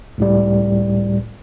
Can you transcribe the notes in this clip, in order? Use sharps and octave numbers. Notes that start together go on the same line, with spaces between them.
C#2 A2 G3